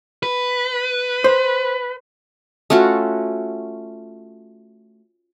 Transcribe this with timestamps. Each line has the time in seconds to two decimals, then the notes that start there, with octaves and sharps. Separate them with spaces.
0.23 B4
1.24 C5
2.70 A3 C#4 F4 F#4